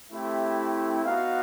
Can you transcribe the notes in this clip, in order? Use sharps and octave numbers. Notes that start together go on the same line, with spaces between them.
A3 C4 E4 G4
B3 D#4 F#4 F5